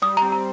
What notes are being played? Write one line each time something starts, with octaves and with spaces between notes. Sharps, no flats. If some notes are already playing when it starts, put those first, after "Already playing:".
G3 D#6
C4 A#5
A#5